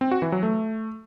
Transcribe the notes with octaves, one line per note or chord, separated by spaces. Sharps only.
C4
F#4
E3
F#3
A3